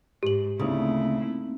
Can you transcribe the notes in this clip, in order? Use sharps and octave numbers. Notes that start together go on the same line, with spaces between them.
G#2 G4 F#7
D2 C#3 A3 A#3 C4 D#4 E4